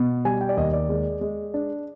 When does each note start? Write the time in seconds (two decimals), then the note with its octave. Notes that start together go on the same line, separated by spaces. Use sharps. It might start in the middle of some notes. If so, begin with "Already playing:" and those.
Already playing: B2
0.25 G3 G#5
0.41 G5
0.49 D5
0.57 D#2 D#5
0.73 D5
0.89 G#3
1.21 G#3
1.54 D4